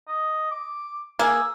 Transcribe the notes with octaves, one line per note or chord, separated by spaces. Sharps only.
D#5
D6
A#3 G#4 E6